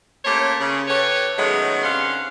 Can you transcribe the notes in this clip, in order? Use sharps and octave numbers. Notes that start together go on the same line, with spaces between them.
A3 A#3 C#4 G4 C5 C#5
C#3
G4 A4 B4 C#5
D#3 F#3 G#3 A3 B3 C#4
C3 C#4 D4 F5 F#5 C6